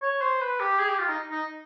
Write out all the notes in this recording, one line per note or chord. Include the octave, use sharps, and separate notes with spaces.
C#5
C5
B4
G4
G#4
G4
F4
D#4
D#4